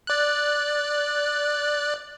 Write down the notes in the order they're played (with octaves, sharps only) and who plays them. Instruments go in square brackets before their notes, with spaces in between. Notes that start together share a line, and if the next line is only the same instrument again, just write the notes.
[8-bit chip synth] D5 F#6